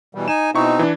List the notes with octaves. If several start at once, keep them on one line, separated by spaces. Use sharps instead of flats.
B2 E3 G3
D#4 G#5 E7
B2 C4 D#4 E4 C#6
E3 D4